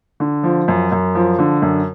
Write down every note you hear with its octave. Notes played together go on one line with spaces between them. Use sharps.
D3
F3
F#2
F#2
F3
D3
F#2